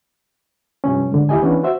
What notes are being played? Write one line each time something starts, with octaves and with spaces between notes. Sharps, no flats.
G2 C3 F3 C#4
G#2 D3
D#2 E4 G4 D#5 G#5
E3 B3 C#4 D4
F#4 C5 E5